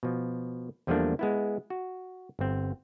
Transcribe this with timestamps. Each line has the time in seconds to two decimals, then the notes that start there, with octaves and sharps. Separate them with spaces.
0.03 B2 F3
0.87 E2 F3 G3 A3 A#3 D4
1.19 G#3 B3 E4
1.70 F#4
2.39 G1 C4